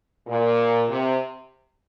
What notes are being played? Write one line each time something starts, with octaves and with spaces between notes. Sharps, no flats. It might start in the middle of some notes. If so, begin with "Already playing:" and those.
A#2
C3